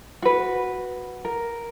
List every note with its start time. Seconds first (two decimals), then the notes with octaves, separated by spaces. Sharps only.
0.22 F#4 B4
1.25 A#4